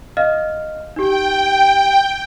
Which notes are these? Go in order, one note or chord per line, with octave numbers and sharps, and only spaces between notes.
D#5 F5 F6
D#4 G4 G5